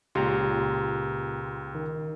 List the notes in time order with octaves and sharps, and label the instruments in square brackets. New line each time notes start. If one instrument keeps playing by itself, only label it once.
[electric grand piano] C#2 [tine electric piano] A#2 A#5 C6 [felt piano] G4
[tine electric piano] D#3